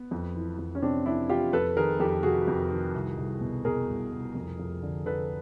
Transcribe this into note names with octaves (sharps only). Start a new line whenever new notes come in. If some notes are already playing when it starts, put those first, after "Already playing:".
Already playing: B3
F2
E3
F2
C#4
C3 C4 D4
F2 D4 E4
E3 F4 G4
F2 A4 B4
D#3 G#4 A#4
F2 G4 A4
C3 F#4 G#4
F2
D#3
C2
C2
B2
B2 G#4 A#4
C2
C2
F2
F2
D3
D3 A4 B4